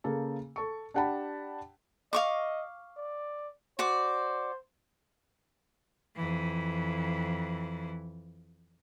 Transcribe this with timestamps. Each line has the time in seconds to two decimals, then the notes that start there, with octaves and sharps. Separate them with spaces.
0.04 C#3 A#3 A4
0.56 A4 C#6
0.94 D4 G4 F#5 G5 A5 B5
2.13 D#5 F5 C#6 D6
2.97 D5
3.79 F#4 C5 D5 D6
6.15 F2 E3